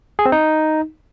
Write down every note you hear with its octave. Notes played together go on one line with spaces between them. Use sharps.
G#4
C4
D#4